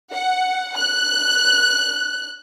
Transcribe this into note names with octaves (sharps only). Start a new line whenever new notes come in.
F#5
F#6